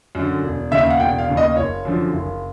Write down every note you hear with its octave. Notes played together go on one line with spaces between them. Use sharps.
F#2 D3
E1
D#2 C#3 E5
F5
F#5
E1 G5
F5
D#2 C#3
D#5
F#1 C#5
F#2 D3 F3
F#1